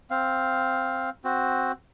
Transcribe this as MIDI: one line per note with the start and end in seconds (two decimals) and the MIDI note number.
0.11 1.10 60
0.11 1.10 77
1.24 1.72 60
1.24 1.72 66